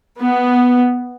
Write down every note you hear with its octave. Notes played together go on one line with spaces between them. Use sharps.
B3